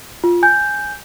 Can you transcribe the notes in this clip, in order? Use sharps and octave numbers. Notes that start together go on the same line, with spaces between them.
F4
G#5 G6